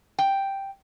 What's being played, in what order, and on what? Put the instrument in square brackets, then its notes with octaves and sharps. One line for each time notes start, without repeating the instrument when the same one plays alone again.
[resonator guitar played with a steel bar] G5